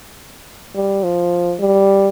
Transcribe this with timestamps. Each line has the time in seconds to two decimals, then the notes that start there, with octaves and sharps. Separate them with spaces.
0.75 G3
1.03 F3
1.60 G3